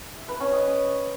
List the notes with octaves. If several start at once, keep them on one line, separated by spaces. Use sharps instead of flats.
E5
B4
C#4
D#5